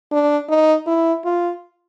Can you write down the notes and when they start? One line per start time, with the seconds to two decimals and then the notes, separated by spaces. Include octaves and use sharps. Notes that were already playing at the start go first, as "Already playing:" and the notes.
0.12 D4
0.49 D#4
0.87 E4
1.25 F4